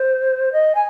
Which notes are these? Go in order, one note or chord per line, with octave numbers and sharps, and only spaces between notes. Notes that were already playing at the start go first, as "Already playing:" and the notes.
Already playing: C5
D#5
G#5